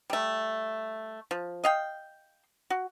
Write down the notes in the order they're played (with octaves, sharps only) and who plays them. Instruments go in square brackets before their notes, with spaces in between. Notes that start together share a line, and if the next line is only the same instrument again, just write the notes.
[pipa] G3 A3
F3
D#5 F5 G5
F#4